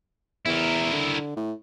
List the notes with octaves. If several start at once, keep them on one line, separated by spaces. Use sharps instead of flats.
E2 E4 A#4
D3
A2